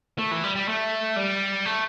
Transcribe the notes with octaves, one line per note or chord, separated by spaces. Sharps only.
A3
E3
G3
G3
A3
G3
A3